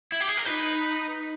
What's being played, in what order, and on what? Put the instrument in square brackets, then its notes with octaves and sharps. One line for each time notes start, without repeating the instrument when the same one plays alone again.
[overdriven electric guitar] E4
G4
G#4
A#4
[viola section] D#4 [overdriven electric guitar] B4